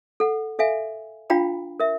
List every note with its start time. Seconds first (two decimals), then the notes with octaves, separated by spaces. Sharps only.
0.20 A4 F#5
0.59 A4 E5 F5 G#5
1.30 D4 F4 F5 G5 A#5 B5
1.80 A#4 E5